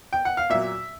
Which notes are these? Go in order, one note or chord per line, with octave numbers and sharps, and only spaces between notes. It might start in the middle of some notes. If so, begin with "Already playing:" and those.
G5
F#5
F5
A#2 F#3 E5